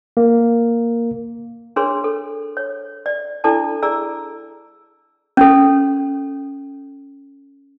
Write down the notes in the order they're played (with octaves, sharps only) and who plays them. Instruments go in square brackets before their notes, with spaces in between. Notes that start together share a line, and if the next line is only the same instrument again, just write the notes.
[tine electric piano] A#3
[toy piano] D4 G#4 A#4 C#5 C6
A4
C#5
D5
D4 E4 A4 D5 A5
G#4 D5 A#5 E6
C#4 A4